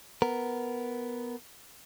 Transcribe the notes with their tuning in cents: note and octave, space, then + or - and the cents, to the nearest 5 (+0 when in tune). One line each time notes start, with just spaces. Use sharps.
B3 +0 A#4 +0